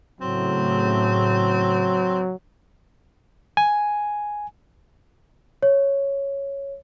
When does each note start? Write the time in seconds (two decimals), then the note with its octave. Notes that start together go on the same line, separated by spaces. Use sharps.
0.21 A2 C#3 F#3 C4
3.57 G#5
5.62 C#5